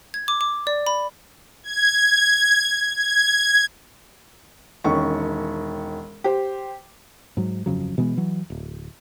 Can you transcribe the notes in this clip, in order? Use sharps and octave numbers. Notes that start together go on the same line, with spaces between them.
G#6
D6
D6
D5
B5
G#6
G#6
E1 D#3 C#4 C#6
G4 C5
G#2 F#3
G1 F2 C#3 F#3
B2 E3 G#3 B3
E3 F#3
D1